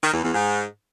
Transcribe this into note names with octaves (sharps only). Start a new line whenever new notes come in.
D#3
E2
E2
G#2